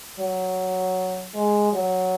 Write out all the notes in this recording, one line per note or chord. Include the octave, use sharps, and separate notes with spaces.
F#3
G#3
F#3